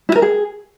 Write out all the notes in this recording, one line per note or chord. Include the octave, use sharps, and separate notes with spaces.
E4
A#4
G#4